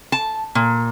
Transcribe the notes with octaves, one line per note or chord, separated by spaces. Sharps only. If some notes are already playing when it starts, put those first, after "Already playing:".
A5
A#2